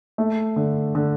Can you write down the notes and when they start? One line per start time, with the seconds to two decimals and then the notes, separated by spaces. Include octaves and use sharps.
0.18 A3
0.56 D3
0.95 D3